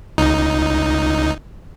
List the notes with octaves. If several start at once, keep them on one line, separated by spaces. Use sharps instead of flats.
C#2 D#4